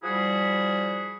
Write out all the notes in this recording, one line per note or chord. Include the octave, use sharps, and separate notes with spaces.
F3 G3 E4 F#4 G#4